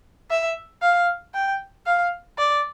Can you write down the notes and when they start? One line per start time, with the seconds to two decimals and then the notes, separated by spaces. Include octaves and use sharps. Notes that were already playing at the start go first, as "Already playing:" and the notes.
0.30 E5
0.82 F5
1.34 G5
1.86 F5
2.38 D5